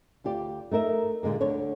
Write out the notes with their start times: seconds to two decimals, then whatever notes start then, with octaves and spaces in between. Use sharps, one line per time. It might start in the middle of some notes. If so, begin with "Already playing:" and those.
0.24 D2 F4 G4 D5
0.71 A3 D#4 A#4 E5
1.23 A#2 D3 G#3 A#3
1.41 D2 D3 D4 C#5